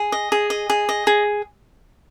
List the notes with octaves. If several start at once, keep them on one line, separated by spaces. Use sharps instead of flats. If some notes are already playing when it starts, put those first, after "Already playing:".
Already playing: G#4
D#5
G#4
D#5
G#4
D#5
G#4